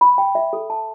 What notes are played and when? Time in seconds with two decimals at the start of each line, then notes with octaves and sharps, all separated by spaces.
0.01 B5
0.18 G5
0.35 E5
0.53 A4
0.70 A5